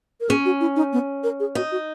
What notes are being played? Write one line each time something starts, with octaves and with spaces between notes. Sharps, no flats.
A#4
C#4 G#4
F#4
E4
D#4
B3
A#4
G#4
D#4 F#4
F#4